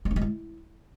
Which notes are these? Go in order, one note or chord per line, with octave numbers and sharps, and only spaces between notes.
G#3
D4
G#3
E4